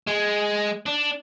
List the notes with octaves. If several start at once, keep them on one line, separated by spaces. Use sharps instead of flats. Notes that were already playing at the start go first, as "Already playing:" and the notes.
G#3
D4